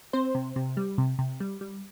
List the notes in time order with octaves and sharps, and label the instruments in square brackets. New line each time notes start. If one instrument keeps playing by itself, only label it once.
[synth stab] C4 C5
C3
C3
G3
C3
C3
G3
G3